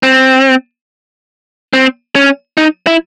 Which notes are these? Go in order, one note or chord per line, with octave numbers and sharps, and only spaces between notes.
C4
C4
C#4
D#4
E4